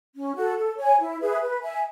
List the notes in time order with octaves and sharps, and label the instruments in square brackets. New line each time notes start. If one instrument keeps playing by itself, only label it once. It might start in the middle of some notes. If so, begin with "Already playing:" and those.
[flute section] C#4
F#4 A4
A4
C#5 G#5
E4
G#4 B4 E5
B4
E5 G#5